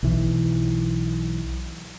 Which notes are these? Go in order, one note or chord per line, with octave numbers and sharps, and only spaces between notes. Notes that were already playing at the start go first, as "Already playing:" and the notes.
B1 E3